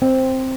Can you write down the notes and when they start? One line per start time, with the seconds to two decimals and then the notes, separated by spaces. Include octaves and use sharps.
0.02 C4